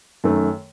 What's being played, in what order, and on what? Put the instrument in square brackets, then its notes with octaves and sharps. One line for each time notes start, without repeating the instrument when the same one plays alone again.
[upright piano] F#2 D#3 A3